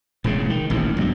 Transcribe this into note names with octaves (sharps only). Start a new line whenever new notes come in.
E1 A2 C#3 G#3
D#3
D#1 A1 D#2 G#2
G2 B2 D3 F#3